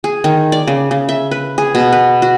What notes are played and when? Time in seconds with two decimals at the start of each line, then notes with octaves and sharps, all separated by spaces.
0.04 G#4
0.24 D#3
0.52 D5
0.67 C#3
0.91 C#3
1.09 E5
1.31 B4
1.58 G#4
1.75 B2
1.93 B4
2.22 F#4